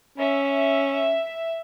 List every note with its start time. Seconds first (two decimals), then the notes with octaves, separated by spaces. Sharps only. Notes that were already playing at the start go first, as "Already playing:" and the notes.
0.18 C#4 E5